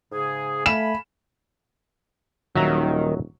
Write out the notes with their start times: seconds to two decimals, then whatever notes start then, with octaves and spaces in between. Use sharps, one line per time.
0.12 G#2 C#3 G#4
0.66 A3 F5 G#5 B5 E7
2.56 D#1 D#3 F#3 E5 A#5